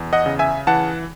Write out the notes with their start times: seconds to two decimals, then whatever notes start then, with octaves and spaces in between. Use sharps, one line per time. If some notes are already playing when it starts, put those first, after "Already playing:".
Already playing: E2
0.13 D#5 F#5
0.26 C#3
0.39 E5 G#5
0.67 E3 F#5 A5